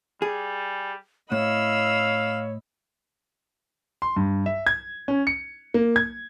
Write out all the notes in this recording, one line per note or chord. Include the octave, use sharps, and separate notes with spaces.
G3 G#4
A2 C#5 D#5 F5 B5 E6
C6
G2
E5
G#6
C#4
C#7
A#3
G#6